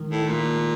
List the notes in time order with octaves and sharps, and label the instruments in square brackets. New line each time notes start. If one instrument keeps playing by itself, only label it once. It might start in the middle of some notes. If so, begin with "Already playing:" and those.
Already playing: [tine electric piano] D#3 G#3
[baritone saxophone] A2
[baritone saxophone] A#2 [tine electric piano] G#3